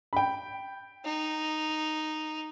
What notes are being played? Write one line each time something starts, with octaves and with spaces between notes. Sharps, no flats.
G5 B5
D#4